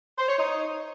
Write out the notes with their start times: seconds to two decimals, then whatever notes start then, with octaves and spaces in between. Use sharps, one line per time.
0.18 C5
0.28 C#5
0.39 D#4